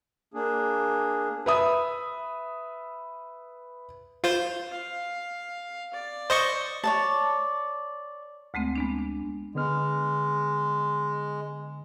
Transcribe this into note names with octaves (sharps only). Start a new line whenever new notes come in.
A#3 D4 G#4
B4 E5 D#6
F4 C5
F5
D5
C5 D#5 C#6
C#5 D5 A5
D2 G#3 A3 C4
G#3 B3 D4
D4
D3 G#3 B3 F6